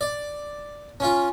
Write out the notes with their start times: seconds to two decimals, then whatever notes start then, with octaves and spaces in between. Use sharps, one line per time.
0.01 D5
1.00 C#4 F4